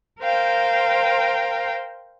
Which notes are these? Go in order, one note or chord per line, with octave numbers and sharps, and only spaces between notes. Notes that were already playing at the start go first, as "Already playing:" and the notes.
A#4 C5 F5 G5